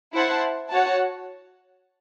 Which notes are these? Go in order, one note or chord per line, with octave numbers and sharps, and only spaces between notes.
E4 C5 F#5 A5
F#4 C#5 F#5 A5